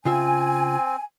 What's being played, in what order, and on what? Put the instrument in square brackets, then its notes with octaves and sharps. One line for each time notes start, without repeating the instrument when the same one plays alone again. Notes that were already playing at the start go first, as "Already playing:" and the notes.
[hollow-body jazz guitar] C#3 F4 E5 [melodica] C4 [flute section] G#5